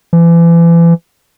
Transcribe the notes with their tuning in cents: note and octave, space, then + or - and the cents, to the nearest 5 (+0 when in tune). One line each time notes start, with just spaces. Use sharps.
E3 +35